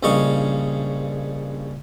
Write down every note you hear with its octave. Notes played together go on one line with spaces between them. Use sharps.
A#1 G2 C#3 D#5 F5 C#6